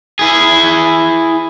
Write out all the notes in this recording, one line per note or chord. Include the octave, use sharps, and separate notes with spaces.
E4 G#4